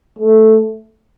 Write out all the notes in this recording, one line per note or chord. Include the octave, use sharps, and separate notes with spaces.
A3